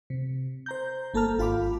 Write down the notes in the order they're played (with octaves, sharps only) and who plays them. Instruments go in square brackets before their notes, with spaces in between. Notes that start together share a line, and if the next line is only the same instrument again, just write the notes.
[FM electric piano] C3
C5 A#5 G6
G1 A#3 A4 A5 A#5 F6
G#1 F4 F5 B5 D6